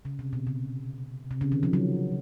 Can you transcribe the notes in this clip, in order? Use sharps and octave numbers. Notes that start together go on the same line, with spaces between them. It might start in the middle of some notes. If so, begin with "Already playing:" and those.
C#3
C3
B2
C#3
C3
C#3
D#3
F3
F#3